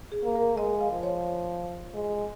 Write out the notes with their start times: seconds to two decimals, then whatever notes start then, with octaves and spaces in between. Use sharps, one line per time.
0.12 G#4
0.24 A#3
0.35 A#4
0.58 G#3 D#5
0.81 F5
0.92 F3
1.03 C#5
1.94 G#3